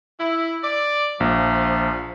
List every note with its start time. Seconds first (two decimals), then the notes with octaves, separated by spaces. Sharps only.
0.19 E4
0.64 D5
1.20 A#1 F3